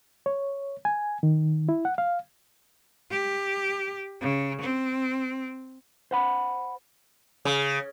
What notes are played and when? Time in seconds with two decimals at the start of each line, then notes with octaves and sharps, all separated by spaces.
0.26 C#5
0.85 G#5
1.23 D#3
1.69 E4
1.85 F#5
1.98 F5
3.11 G4
4.21 C#3
4.61 C4
6.11 C5 F#5 B5
7.45 C#3